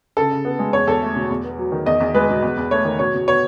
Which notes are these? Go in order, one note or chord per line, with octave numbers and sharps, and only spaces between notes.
C#3 A4
C#3
B3
G#3
E2 C#5
E2 A4
A3
B2
E2
B3
F#3
D#3
E2 D#5
E2
G#3 B4
B2
E2
E2
A3 C#5
D#3
B2 C#5
B2
B3 C#5